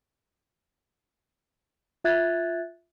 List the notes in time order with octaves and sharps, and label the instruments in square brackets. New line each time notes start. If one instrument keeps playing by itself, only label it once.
[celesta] F4 E5 F#6 G#6 A6